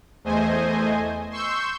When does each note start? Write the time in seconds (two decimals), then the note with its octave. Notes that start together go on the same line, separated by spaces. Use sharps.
0.24 E2 A3 C5 D#5 G#5
1.31 C6 C#6 E6 G6